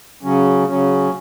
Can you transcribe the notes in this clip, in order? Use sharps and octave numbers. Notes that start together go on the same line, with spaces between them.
C#3 F#3 C#4
C#3 F#3 C#4